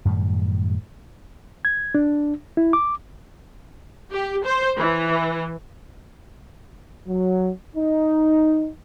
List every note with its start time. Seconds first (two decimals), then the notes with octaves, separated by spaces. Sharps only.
0.05 F#2 A2 D#3 G3
1.65 G#6
1.95 D4
2.57 E4
2.73 D6
4.13 G4
4.45 C5
4.77 E3
7.08 F#3
7.76 D#4